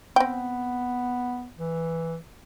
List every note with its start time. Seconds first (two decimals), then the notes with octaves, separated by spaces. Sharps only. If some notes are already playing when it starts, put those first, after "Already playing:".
0.16 B3 C4 G5
1.58 E3